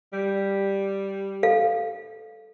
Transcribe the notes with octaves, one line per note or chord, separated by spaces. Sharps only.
G3
A4 F5